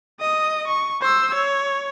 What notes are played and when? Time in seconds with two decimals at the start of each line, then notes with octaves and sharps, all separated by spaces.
0.20 D#5 D#6
0.68 C#6
1.02 C5 E6
1.34 C#5